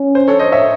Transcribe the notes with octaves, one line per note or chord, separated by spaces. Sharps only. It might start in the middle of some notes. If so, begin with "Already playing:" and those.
Already playing: C#4
C5
A4 C#5
C5 D#5
C#5 E5